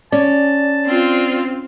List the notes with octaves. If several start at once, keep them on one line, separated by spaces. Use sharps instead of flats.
C#4 D5 A5
C4 F4